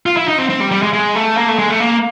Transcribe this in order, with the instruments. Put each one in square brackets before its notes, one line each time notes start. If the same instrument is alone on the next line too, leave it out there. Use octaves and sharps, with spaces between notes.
[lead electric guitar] F4
E4
D#4
C4
C4
G3
G3
G#3
G#3
A3
A#3
A3
G#3
A3
A#3